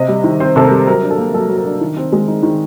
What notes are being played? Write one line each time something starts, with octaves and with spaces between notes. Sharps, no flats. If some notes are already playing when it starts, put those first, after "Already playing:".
Already playing: C3 D#5
G3
D#3
C4 C5
C3 A4
A#4
G3
F#3 A#4
D4
A4
A#3
F#3 A4
F#3
A#4
D4
D#3
C4
G#3
D#4
D#3